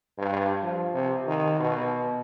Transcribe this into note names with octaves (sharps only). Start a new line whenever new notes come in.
G2
F3
C3
D#3
B2